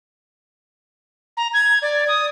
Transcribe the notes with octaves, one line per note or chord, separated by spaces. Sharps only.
A#5
G#6
D5
D#6